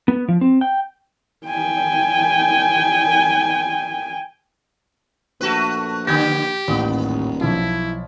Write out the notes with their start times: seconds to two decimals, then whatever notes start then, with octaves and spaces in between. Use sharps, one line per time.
0.08 B3
0.28 F3
0.41 C4
0.61 G5
1.46 G5 G#5
5.41 A#1 A3 F#4 B4
6.07 D3 B3 G4 B5 G#6 A#6
6.68 D#1 A1 B3
7.41 B1 F3 E4